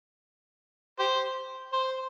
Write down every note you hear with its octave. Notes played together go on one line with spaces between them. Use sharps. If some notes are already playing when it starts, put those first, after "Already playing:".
G4 C5
C5